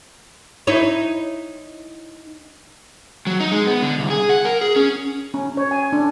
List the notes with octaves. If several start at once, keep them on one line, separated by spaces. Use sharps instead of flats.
D#4 E4 C#5
F#3
D#4
G#3
B3
D3
C2
G#4
F#5
A#4
G#4
C#4
C#4
C#5
G#5
D4